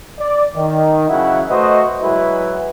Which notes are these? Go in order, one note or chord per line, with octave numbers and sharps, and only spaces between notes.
D5
D#3
C#3 F#3 E4 F#5
A3 F#4 B4 C5 D#5
F#3 G#3 E4 F#4 B4